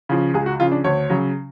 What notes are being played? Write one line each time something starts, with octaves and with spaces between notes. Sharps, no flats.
C#3 F3
C#2 G#4
F#4
C#3 F3 F4
D4
D2 C#5
C#3 F#3